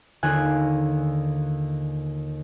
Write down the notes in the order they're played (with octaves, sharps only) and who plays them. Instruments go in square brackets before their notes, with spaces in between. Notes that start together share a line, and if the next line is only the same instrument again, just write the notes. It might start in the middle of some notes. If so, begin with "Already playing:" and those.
[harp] D#2 D3 F4 G#5 F#6 G#6